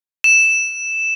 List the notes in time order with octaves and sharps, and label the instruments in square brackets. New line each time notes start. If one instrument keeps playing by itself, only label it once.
[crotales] E7